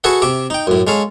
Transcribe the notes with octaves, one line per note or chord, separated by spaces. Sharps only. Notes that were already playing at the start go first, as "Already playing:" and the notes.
F#4 G#4 A4 B4 E5 F#5
C3 E5 D6
D#4 G5
F#2 A2
G#3 C#4 A4 F5